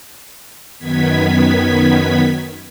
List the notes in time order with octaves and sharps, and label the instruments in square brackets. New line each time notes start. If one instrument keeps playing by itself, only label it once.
[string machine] F#2 D#3 B3 G#6 B6